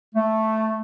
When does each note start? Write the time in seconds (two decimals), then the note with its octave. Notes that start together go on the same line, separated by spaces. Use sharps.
0.15 A3